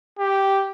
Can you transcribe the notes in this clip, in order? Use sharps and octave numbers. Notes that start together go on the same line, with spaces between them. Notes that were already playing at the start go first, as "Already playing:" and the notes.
G4